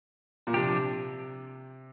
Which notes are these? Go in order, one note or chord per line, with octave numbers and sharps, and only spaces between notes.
A#2
C3 F3 D4 G4